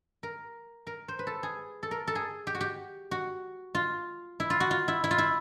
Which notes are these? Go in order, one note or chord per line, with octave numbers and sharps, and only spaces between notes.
A#4
A#4
C5
B4
A4
G#4
A4
A#4
A4
G#4
G4
F#4
G4
F#4
F4
E4
F4
F#4
F4
E4
E4
F4
E4